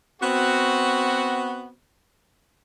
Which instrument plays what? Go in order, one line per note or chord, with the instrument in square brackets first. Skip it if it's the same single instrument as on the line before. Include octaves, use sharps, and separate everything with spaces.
[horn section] B3 C4 F#4